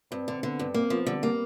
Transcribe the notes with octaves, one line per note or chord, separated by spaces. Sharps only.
G2 C4
D3
C4
D3 B3
G2
A#3 C4
F3 B3
D3 G3
G3 A#3